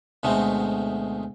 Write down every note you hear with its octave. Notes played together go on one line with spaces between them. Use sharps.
D2 B2 G#3 A3 C4